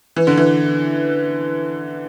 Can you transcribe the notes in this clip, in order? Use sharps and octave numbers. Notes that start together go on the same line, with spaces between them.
E3
D3
E3